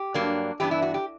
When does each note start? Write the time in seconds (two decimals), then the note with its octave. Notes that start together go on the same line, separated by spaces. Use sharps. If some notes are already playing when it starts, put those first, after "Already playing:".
Already playing: G4
0.14 G2 F#3 A#3 D4
0.60 G2 E3 B3 D4 G4
0.71 E4
0.82 F#4
0.94 G4